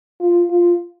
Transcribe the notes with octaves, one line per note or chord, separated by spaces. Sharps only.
F4
F4